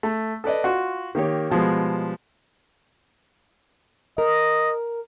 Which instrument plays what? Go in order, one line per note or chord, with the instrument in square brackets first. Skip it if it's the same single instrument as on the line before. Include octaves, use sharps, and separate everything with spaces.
[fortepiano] A3
A4 B4 D5 D#5
F4 F#4 F#5
D#3 A#3 G4 C#5
B2 F3 G3 G#3 B3
[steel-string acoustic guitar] A#4 [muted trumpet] D#5